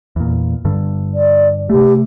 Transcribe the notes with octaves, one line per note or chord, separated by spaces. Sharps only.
E2 A#2
G2 D3
D5
C3 A3 G4